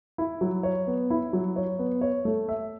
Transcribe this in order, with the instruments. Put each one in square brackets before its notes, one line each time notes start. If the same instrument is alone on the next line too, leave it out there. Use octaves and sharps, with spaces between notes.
[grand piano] E4
F#3
C#5
B3
E4
F#3
C#5
B3
C#5
A3
E5